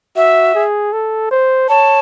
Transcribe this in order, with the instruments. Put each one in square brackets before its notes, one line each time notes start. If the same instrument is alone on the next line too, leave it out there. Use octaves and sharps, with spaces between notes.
[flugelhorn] F#4 [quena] E5
[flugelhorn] G#4
A4
C5
[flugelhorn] C#5 [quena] A5